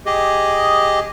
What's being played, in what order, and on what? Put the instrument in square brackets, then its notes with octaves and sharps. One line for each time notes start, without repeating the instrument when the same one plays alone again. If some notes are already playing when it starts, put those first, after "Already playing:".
[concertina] G4 G#4 D#5